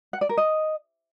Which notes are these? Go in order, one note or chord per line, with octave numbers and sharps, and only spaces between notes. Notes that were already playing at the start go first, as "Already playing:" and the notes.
F#5
D5
A#4
D#5